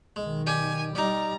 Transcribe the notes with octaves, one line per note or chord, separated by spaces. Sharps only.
B1 D#3 G#3
G4 D5 G#5
G3 D#4 D5 A#5